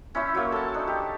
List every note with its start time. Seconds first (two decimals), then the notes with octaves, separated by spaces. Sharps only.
0.15 C#4 E4 C5 E5
0.35 F#3 A#3
0.52 A4 A5
0.74 D4 D#4
0.88 G4